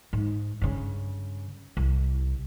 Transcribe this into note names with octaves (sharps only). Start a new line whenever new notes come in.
G#2
G2 C#3
C2